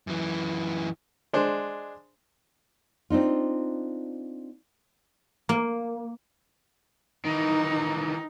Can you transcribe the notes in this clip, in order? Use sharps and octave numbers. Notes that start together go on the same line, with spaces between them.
F#2 E3
G#3 D4 C5
C4 D4 D#4 F4
A#3
D#3 E3 D#4